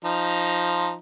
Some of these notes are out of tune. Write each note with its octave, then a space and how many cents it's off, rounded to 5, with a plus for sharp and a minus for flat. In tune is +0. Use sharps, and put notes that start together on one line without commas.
F3 +0 D#4 +0